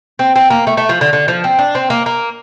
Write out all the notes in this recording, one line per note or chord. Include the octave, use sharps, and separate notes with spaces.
C4
C4
A#3
A3
A3
F3
D3
D3
F3
C4
D4
C4
A#3
A#3